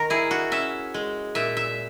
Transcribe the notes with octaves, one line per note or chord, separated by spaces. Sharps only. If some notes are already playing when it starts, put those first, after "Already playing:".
Already playing: D#3 A#4
E4 G#4
F#4
C#4 E5
G#3
A#2 E5
E5